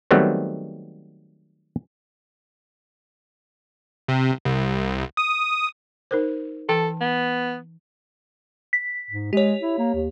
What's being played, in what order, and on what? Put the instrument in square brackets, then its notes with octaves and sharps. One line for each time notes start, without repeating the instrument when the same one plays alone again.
[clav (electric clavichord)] D#3 F#3 G3 A3 B3 C4
[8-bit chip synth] C3
C2
D#6
[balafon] D#4 A#4 C5
[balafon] E3 G5 A5 [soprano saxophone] A4
[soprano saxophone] B3
[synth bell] B6
[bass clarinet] G#2
[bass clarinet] G#3 [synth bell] G4 C#5
[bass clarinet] E4
A#3
D#2